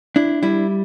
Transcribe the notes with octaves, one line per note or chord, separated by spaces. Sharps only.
D4 E4
G3 E4